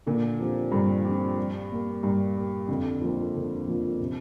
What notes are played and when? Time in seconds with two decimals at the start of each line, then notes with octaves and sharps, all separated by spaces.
0.06 A#2 D3
0.39 F3 C4 G4
0.72 G2 D3
1.05 F3 C4 G4
1.38 G3
1.71 A#3 G4
2.03 G2 G3
2.36 A#3 G4
2.68 F2 D3
3.01 F3 A#3 F4
3.34 D3
3.67 F3 A#3 F4
4.00 C3